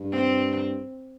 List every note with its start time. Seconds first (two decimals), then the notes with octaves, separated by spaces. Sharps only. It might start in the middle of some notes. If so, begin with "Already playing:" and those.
Already playing: G2
0.11 C4